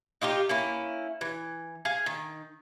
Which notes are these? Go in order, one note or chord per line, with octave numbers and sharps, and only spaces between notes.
D#4 F4 G4 A#4
A#3 C#4 E4
E3
G#4 F5 G#5
D#3